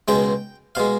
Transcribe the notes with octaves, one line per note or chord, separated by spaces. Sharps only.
C#2 B2 G#3 G5
B2 G#3 F5